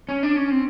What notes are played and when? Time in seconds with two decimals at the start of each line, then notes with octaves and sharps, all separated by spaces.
0.09 C#4
0.23 D4
0.36 C#4
0.51 C4